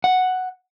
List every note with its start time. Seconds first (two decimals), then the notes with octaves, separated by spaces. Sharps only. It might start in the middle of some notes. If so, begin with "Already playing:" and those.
0.04 F#5